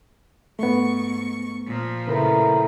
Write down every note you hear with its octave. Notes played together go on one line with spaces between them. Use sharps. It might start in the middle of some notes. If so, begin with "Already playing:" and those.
G#2 A3 B3 C#6
A#2 F3
A2 C#3 A#4 B4